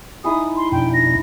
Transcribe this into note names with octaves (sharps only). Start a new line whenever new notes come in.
D#4 E4 G#4 D#6
C6
F2 B2 D4 G5
A#6